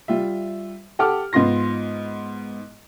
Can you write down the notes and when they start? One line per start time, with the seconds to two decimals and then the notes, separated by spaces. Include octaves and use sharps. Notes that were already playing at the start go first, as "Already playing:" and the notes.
0.08 G3 F4 E5
0.99 G4 A4 F#5 D6 F6
1.33 G#2 B3 F4 C6 A#6